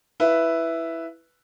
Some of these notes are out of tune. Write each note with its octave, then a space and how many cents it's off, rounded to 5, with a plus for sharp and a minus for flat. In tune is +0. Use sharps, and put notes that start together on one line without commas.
E4 +0 B4 +0 F5 +0